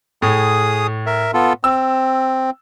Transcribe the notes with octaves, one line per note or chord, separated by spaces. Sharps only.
A2 G#4 D#6
A#4 E5
B3 F4 A4
C4 E6